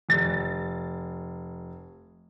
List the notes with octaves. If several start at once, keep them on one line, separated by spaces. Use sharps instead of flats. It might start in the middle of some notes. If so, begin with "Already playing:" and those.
F1 A6